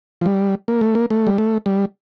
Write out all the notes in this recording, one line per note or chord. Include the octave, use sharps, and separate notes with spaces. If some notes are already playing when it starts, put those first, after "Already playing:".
F3
G3
A#3
A3
A#3
A3
G3
A3
G3